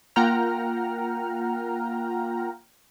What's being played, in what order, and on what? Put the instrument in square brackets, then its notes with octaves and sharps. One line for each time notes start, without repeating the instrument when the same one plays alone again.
[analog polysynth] A#3 F4 F#5 G5 A#5 F6